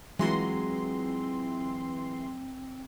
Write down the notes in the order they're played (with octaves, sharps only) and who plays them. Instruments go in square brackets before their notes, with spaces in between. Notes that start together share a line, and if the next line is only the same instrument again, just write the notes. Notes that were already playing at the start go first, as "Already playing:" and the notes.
[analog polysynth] E3 C6 [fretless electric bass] F#3 [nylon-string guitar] G#3 F4 F#4 [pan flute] C4